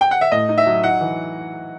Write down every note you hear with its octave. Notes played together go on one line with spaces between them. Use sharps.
G5
F#5
E5
A2 D#5
D#4
E5
F#3
D#4 F#5
E3